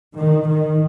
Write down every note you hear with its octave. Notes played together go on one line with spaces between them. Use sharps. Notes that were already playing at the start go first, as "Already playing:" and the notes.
D#3
D#3